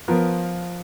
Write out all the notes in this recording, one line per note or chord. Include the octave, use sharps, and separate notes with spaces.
F3 B3 F4 A#4